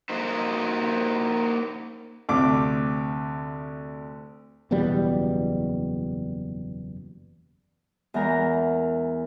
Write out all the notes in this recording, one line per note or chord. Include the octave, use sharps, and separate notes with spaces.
A#3 D#4 F#4 C5
D2 C3 D6
F#1 E2 B2 G3
E2 E3 G#3 A#4 A#5